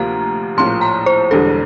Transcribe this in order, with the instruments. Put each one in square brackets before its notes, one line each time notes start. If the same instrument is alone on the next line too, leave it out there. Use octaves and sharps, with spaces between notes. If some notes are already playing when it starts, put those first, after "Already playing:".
Already playing: [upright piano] D2 C3 F3 A#3 F4 [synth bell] A#5
[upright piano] A#1 A2 F3 A#3 [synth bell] C6
[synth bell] A#5
C5
[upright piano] E1 E2 D3 G3 D4 [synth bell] A4